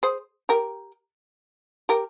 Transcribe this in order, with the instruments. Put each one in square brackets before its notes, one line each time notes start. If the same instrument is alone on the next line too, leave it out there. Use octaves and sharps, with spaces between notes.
[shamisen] G#4 C5
G4 A#4
G4 A#4